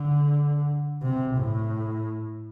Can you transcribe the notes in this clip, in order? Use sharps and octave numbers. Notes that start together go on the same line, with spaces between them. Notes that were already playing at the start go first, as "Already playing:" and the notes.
Already playing: D3
C3
A2